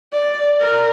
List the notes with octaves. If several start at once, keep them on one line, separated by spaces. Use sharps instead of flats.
D5
A#4